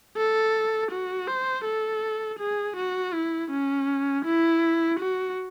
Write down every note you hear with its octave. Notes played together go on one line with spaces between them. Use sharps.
A4
F#4
C5
A4
G#4
F#4
E4
C#4
E4
F#4